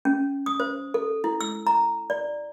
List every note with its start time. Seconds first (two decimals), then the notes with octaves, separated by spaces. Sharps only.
0.05 C#4
0.46 D#6
0.60 C5
0.94 A4
1.24 E4
1.41 E6
1.67 A#5
2.10 D5